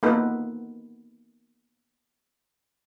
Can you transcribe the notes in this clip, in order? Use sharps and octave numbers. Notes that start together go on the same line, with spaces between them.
A#3 B3 D#4 F4 A4 B4